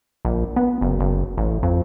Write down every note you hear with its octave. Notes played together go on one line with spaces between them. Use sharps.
A#1
B3
F#1
F#1
A1
F2